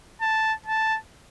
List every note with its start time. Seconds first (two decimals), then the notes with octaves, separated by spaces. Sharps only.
0.21 A5
0.66 A5